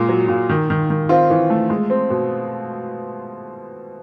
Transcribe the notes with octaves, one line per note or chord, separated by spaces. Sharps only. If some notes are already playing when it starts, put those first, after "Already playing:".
Already playing: A#2 G#3
F#3
A#2
D#3
D#3
D#3
C4 F4
E3
A3
G#3
C4
B2